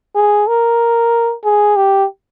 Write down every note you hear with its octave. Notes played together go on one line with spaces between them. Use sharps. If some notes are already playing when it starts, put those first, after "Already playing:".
G#4
A#4
G#4
G4